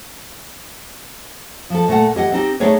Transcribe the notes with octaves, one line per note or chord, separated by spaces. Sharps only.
F3 A4
A#2 A3 A4 F#5
E3 G4 D#5 F#5
C4 D#4 G4
A3 B3 D#4 G#4 C#5 D5